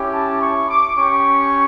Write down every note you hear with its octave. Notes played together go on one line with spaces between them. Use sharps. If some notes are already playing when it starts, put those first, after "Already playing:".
Already playing: C#4 E4 G4
A5
C#6
D6
C#4 G4 C#6